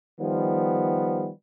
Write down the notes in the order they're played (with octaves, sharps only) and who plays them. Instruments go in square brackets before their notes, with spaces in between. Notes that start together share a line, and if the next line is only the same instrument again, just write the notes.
[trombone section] D#3 F3 G3 B3